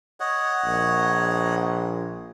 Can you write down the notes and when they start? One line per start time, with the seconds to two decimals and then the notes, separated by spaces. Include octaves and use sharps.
0.20 C#5 D#5 F#5
0.65 A#1